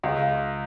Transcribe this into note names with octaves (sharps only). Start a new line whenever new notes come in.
C#2